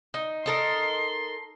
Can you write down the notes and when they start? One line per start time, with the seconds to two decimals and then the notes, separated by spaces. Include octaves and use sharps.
0.14 D#4
0.46 D#4 A4 A#4 C6